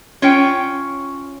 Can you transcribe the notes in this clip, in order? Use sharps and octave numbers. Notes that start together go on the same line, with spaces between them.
C#4 F4 C#5 G5